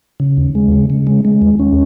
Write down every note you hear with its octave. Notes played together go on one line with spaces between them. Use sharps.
C#3
D#2
G#3
C#3
C#3
G#3
G#3
D#2
C#4